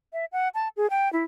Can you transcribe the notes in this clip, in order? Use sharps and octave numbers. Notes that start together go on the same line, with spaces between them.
E5
F#5
A5
G#4
G5
E4